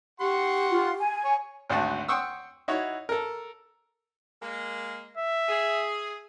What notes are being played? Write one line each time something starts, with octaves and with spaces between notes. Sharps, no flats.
G4 F#5 C6 C#6
F4
G#5
C#5
G#1 D2 F#4 A5
F#5 G5 C6 C#6 D#6 E6
D#4 E4 F#4 C#5
A4 A#4
G#3 A#3
E5
G#4